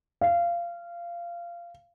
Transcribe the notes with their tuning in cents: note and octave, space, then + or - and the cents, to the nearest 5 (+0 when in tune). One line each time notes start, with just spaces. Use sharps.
F5 -20